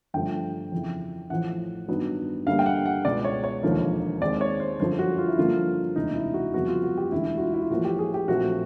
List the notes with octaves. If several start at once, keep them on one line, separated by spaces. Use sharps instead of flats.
G1 G2 D3 F3 A3 G5
F2 C#3 E3
A1 A2 F3 F#5
G2 D#3 F#3 B3
G2 D3 G3 A#3 F5
G5
F#5
F#5
C#2 B2 G#3 B3 D5
C#5
C#5
E1 D#2 D3 F3 A#3
D#2 D#3 G#3 C4 D5
C#5
C5
G1 F#2 D3 F3 C5
F#4
F4
E4
G2 D3 F3 A#3 F4
E1 D2 C3 E3 D#4
E4
F#4
G1 F2 C#3 F#3 B3 F#4
F4
F#4
G4
E1 D2 D3 E4
F#4
F4
E4
F4
A1 A2 F3 A#3 F#4
G4
G#4
G4
A#1 A#2 F#3 A3 C4 F#4